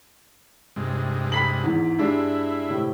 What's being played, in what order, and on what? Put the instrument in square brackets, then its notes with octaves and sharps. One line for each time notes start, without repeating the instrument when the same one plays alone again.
[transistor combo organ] G2 C3 G#3
[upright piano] B5 B6 F#7
E2 G#2 E3
[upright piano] G2 G#3 D4 [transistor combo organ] E4
[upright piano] A2 C3